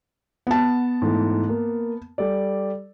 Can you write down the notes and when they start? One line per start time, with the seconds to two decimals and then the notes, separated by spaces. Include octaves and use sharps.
0.47 B3 F#5 A5
1.02 G#2 E3 A3
1.49 A#3
2.18 G3 A4 D5